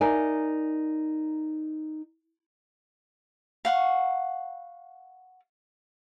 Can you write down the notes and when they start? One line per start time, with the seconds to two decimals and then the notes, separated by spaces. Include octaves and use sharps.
0.01 D#4 A#4 D5 E5 G#5
3.65 F5 F#5 C#6